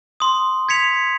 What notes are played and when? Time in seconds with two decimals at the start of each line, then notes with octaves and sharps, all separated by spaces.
0.20 C6 D#6
0.69 G#6 B6 C#7 F7